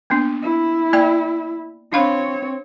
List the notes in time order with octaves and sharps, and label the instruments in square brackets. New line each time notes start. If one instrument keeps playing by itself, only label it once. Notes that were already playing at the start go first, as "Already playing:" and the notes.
[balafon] A#3 B3 D4
[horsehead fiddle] E4
[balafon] A#3 D5 G5
[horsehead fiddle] C4 C#5 [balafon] D4 F5 B5